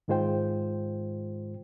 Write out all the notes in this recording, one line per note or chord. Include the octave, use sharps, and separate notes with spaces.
G#2 D#3 G#3 F4 C5 G5